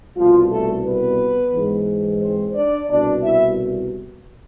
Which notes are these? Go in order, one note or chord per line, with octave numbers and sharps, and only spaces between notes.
C2 B2 F3 F4
A3 A4
B3 B4
G#2 E3
C4 C5
D4 D5
C2 B2 D4 D5
E4 E5